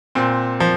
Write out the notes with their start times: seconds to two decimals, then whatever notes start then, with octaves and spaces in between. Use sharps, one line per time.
0.15 A#2 C4
0.60 F3